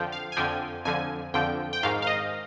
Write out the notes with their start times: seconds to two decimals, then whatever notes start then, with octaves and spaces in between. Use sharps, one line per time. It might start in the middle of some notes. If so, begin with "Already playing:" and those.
Already playing: F2 D3 F3 G5
0.12 F5
0.32 G#5
0.37 F2 D3 F3 G5
0.85 F2 D3 F3 G#5
1.34 F2 D3 F3 G5
1.73 G5
1.83 G#2 D#3 F5
2.02 F5
2.07 D#5